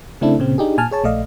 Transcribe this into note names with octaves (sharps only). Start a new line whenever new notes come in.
C#3 A3 C4 D4 E4 A4
A#2 C#3 C4
D4 D#4 G4 G#4
A#2 G#5 A5 F6
G#4 C#5 A5
A#1 A3 D5 D#5 F5